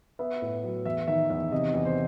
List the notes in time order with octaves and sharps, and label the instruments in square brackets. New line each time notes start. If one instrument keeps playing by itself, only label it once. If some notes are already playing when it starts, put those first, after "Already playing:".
[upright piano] B3 E5
A2
F#3
E2 E5
D#3 E5
E2 E5
C3 D#5
E2
C5